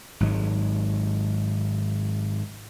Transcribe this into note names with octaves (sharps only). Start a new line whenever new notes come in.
G#1 G#2 F#3 G#3